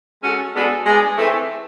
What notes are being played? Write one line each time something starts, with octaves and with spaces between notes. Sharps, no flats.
G#3 C#4 F#4 A4
G#3 B3 D4 F#4 A4
G#3 B3 D4
E3 A3 C4